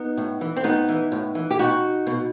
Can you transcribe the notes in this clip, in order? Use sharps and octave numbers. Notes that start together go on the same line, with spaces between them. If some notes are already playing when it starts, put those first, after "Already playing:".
Already playing: B3 D#4
A2
E3
C4
A2 B3 D#4
E3
A2
E3
G4
B2 D#4 F#4
B2